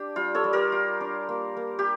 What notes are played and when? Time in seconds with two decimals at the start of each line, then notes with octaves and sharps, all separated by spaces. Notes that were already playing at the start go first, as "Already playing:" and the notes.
Already playing: D4 G4
0.16 G3 F4
0.35 A4 C#5
0.44 G3
0.53 G4 A#4
0.72 F4
1.01 D4
1.29 A#3
1.57 A#3
1.79 G4